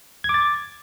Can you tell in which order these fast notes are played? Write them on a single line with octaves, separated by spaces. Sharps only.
G#6 D6 A6